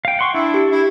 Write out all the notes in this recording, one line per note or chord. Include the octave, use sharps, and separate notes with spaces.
F5 G5
F#5 C6 C#6
D4 E4
G4
E4